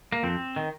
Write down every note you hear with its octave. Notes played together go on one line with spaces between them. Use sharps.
A#3
F2 C4
D#3